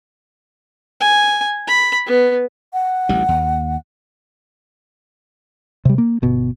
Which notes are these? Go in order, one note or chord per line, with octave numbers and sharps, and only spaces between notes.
G#5
B5
B3
F#5
A1 D2 G3
D#2
C3 G3
A#3
G1 B2